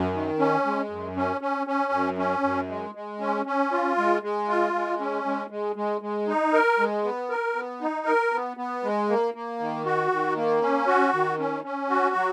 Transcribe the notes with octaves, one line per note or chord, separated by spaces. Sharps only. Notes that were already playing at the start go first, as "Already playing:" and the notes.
Already playing: F#2
D#3
C#4
G#3
F#2
C#4
C#4
C#4
F#2
C#4
F#2
G#3
G#3
C#4
C#4
F4
G#3
G#3
F4
G#3
C#4
G#3
G#3
G#3
G#3
D#4
A#4
G#3
B3
A#4
B3
D#4
A#4
B3
B3
G#3
A#3
A#3
D#3
F#4
D#3
A#3
C#4
F#4
D#3
C#4
C#4
F#4
F#3